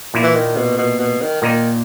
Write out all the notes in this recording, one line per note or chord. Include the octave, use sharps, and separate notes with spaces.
A#2 A#3 E4
E3
D#3
B2
B2
B2
D#3
A#2 D#3 A#3 D#4